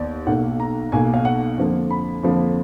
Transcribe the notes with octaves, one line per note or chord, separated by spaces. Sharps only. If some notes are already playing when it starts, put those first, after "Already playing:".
Already playing: D#2 D#3 B3 D5
B1 B2 A#3 F#5
A#5
B1 B2 A#3 G#5
F5
F#5
F2 D3 F3 A#3
B5
F2 D3 F3 A#3